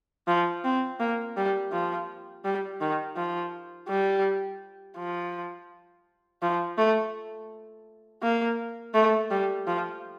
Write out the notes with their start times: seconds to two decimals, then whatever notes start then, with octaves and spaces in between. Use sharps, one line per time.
0.28 F3
0.64 C4
1.00 A#3
1.37 G3
1.72 F3
2.45 G3
2.81 D#3
3.17 F3
3.89 G3
4.97 F3
6.42 F3
6.78 A3
8.22 A#3
8.94 A3
9.31 G3
9.67 F3